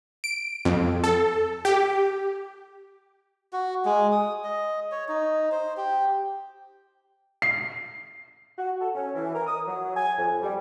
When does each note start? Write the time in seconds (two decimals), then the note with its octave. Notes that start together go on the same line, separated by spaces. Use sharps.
0.24 D7
0.65 F2
1.04 A4
1.65 G4
3.53 F#4
3.85 G#3
4.12 D#6
4.44 D#5
4.92 C#5
5.08 D#4
5.52 C5
5.77 G4
7.42 C7
8.58 F#4
8.80 A4
8.95 C#4
9.15 E3
9.35 A#4
9.47 D#6
9.67 F#3
9.96 G#5
10.18 F2
10.41 G3